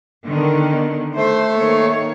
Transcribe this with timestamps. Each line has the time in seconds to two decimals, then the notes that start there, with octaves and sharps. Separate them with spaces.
0.25 D3 D#3 B3
1.16 A3 C5
1.57 D#3 A#3 C#5